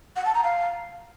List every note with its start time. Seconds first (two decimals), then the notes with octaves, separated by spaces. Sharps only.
0.16 F#5
0.25 A5
0.34 A#5
0.44 F5